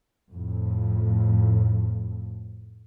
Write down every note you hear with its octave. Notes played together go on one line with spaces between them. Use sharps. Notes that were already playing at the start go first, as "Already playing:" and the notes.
F2 A2